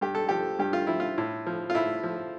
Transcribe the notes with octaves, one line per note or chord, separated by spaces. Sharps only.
G2 G4
A4
F3 G4
G2 G4
F4
F3 E4
F4
A2
F3
F4
A2 E4
F3